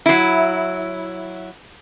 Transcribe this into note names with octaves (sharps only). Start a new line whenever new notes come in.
F#3 E4